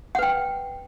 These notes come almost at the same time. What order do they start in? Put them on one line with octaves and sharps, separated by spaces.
F#5 B4 G5